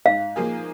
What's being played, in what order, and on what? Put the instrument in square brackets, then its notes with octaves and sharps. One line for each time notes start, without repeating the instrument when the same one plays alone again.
[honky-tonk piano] G#2 [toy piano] F5
[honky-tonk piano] F3 A#3 F4 G#4